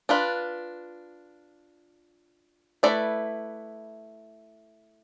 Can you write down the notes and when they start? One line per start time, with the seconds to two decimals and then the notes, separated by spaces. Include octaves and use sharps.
0.09 D4 F4 B4
2.83 A3 E4 B4 D5